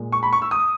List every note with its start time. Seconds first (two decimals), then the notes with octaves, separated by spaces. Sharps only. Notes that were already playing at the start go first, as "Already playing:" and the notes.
Already playing: A#2 G#3
0.12 C#6
0.23 B5
0.33 C#6
0.42 E6
0.51 D#6